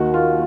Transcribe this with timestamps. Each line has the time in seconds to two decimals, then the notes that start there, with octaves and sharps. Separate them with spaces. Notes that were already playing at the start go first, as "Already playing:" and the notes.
Already playing: D#2 D#3 F#4
0.14 F4